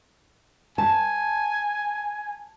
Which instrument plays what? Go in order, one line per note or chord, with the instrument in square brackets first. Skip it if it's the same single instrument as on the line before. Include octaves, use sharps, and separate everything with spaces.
[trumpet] G#5 [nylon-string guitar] A5